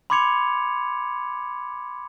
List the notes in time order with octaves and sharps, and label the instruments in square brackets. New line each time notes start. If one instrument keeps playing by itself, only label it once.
[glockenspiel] B5 C6 D6 G#6 C#7 F7